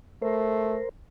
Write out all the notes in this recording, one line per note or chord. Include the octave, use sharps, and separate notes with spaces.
A3 A#4 C5